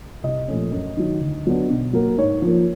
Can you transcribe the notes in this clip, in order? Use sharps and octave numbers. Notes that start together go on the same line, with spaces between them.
C2 D#5
A#2 F3 A3 C#4
F#2
D#3 F#3
D2
D3 F#3 B3 D4
B2
F#3 A#3
G#2 C#5
F3 A#3